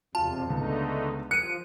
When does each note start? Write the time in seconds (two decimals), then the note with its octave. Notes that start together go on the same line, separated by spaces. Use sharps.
0.15 E1 F2 C3 F4 A5
0.49 C#2 D3 A3 B3 D#4
1.31 F3 F#6 C#7 D#7